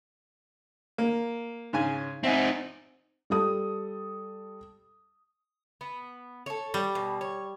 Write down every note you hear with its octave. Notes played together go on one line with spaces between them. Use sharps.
A#3
G#2 C#3 G#5
C4 D#4 E5 F#5 G#5
G3 A4 D#6
B3
A4 C#5
G3
B2
C#5